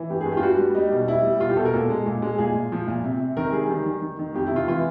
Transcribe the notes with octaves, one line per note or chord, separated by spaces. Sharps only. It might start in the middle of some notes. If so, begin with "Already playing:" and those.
Already playing: E3
G2 G4
G#4
G2
F4 G4
G3 F#4
G3
G3 D#4
B2
G3 E4
G3
B2 F4
G4
B2 A4
A#4
A#2 A4
G#3
A#2
G#3
A#2 G#4
A#2
F3
A#2
C3
C3
D#3 A#4
G3 G#4
D#3
D#3
D#3
D#3
F2 G4
E4
C3 F4
E3 F4